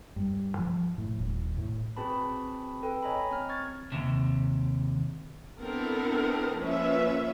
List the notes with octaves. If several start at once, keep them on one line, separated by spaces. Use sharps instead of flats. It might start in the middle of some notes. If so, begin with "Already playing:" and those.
G2
F3
A2
D#1
A2
C4 F#4 G#4 B4 A5 B5
A4 B4 G5
C#5 D#5 G#5 A#5 B5
C4 F6
C#6 F6 G#6 A6
D#2 C3
B3 C4 D4 E4 A4 A#4
F3 A#3 C#4 F4 B4 E5